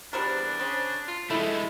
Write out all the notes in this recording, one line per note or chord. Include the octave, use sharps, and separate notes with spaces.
E2 G3 C4 D4 A#4
C#3 C4
F4
D3 G#3 A3 E4